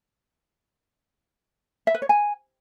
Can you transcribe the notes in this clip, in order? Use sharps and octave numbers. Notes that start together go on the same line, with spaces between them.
E5
B4
C#5
G#5